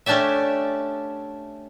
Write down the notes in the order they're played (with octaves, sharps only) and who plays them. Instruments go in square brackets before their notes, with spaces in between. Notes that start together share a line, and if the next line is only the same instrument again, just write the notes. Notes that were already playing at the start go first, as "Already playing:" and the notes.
[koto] A3 C#4 D4 G4 D5 E5